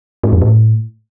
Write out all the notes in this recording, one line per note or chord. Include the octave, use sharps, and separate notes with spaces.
G#2
F2
A2